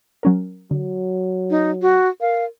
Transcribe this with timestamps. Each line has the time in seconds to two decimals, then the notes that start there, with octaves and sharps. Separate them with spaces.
0.23 F#3 C#4 A#4
0.71 D3 F#3
1.50 D#4
1.82 F#4
2.21 A#4 F5